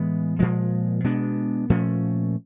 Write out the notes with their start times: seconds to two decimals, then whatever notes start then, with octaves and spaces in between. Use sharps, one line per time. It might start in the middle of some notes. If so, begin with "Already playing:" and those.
Already playing: A2 E3 G#3 B3
0.39 A#2 F3 G#3
1.04 B2 G#3 B3 D4
1.70 A#2 F3 A3 C#4